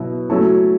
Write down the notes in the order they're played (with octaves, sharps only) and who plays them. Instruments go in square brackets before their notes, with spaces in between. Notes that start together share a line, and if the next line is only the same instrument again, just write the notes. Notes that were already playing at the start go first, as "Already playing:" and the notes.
Already playing: [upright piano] B2 F#3 B3 E4
F#3 A3 C#4 E4 A4